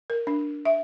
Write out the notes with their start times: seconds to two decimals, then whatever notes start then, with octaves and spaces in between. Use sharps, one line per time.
0.10 A#4
0.27 D4
0.65 E5